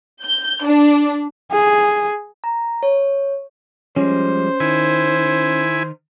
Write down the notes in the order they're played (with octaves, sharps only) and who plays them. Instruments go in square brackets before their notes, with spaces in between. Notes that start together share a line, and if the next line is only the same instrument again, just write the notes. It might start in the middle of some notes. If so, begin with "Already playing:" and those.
[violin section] G6
D4
[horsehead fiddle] G#4
[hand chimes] A#5
C#5
[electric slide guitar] F3 G3 G#3 [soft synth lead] C#4 [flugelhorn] C5
[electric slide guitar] D#3 [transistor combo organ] E4 G#5